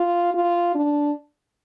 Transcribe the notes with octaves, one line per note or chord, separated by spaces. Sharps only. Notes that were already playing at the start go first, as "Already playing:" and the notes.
Already playing: F4
F4
D4